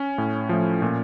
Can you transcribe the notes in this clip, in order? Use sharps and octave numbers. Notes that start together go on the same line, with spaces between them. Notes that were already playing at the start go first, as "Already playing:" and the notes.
Already playing: C#4
A2
F3 A3
A#2